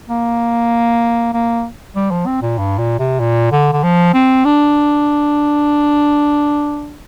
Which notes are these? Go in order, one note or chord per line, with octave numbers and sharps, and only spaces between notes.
A#3
A#3
G3
F3
C4
A#2
G2
A#2
C3
A#2
D3
D3
F3
C4
D4